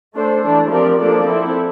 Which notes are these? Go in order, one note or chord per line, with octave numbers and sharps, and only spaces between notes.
A3 D4 A4 C5
E3 A3 D4
F3 C4 G4 A#4 D5
F3 A#3 D4 A4 D5
C4 E4 A4